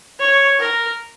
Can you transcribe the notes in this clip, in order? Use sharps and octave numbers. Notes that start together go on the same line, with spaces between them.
C#5
A#4